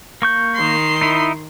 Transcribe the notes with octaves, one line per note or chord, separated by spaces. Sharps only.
A#3 C#6 G6
D#3 C6
D#4 E4